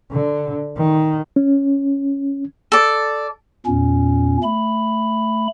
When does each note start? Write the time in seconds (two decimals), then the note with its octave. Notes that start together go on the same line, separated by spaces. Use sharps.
0.12 D3
0.77 D#3
1.36 C#4
2.72 A4 D5
3.66 E2 A#2 C#4
4.43 A3 B5